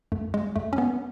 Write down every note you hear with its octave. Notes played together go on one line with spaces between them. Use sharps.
F#2 A3
G#3
F#2 A3
C#4
B3